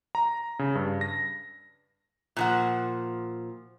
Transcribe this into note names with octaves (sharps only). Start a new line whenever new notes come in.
A#5
C#3
G2
A#6
A#2 F3 F#5